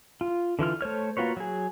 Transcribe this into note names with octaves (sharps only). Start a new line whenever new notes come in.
F4
D3 E3 F4 F6
A3 C5 C#5 F6
A#3 F4 F#4 B4 C#5
F#3 G#4